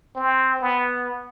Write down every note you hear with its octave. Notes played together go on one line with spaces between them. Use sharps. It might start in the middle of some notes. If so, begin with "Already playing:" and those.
C4
B3